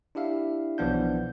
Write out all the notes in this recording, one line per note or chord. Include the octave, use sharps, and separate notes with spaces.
D4 E4 G4 E5 F5
B1 E3 F3 B3 D4 G6